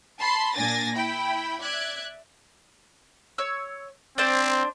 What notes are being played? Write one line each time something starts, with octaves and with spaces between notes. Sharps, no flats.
A5 B5 C6 C7
A#2 D4 G#5 A6 A#6
E4 G5 B5
D5 E5 F#6 G#6
C#5 E6
C4 D4 C5